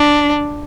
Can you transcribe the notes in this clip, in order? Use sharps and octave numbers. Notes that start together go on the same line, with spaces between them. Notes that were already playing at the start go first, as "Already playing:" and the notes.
Already playing: D4